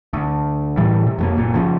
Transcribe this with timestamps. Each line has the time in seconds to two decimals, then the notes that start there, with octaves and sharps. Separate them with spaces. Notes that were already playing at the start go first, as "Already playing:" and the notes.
0.13 D2
0.77 A2 E3 G3
1.07 C3
1.18 F2 G#3 A#3
1.37 F#1 A#2
1.55 C#3 F3